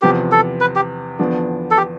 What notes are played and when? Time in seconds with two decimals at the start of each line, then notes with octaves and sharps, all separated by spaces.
0.02 E2 C3 F3 B3 G4
0.32 A4
0.61 B4
0.76 G4
1.19 E2 D3 F3 B3 D4
1.71 A4
1.77 G4